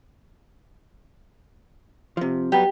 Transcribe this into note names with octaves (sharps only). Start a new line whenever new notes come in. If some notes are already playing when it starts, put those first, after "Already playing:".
C3 F3
F#3 G3 B3 G4